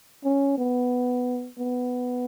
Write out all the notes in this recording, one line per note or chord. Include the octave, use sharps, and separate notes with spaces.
C#4
B3
B3